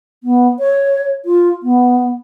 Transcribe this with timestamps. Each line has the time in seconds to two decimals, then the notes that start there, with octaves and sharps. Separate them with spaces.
0.24 B3
0.60 C#5
1.25 F4
1.63 B3